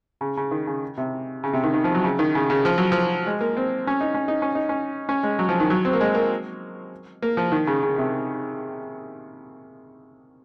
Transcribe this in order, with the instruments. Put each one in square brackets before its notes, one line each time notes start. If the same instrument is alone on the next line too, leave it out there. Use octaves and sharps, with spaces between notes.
[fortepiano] C#3
C#3
D#3
C#3
C3
C#3
C3
D#3
D#3
F3
F#3
C#3
D#3
C#3
C#3
F3
F#3
F3
G#3
A#3
C4
C#4
D#4
C#4
D#4
C#4
D#4
C#4
C#4
G#3
F#3
F3
D#3
F#3
C4
A#3
G#3
A#3
A#3
F3
D#3
C#3
C#3
C3